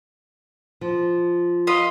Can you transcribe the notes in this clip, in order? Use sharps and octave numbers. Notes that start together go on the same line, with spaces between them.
F3
F4 D#5 B5